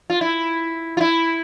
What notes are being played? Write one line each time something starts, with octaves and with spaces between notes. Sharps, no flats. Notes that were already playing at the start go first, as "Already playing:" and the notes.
F4
E4
F4
E4